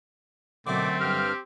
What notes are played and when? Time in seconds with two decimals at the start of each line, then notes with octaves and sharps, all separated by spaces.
0.67 F#2 B2 D3 A3 C4 D6
1.00 G2 G4 F6